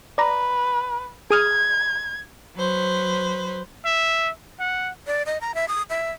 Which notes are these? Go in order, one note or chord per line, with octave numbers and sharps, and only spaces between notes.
B4 D5 A#5
G#4 D#6 F6 G#6
F#3 B4 C5
E5
F#5
D5
D#5
A#5
E5
D#6
E5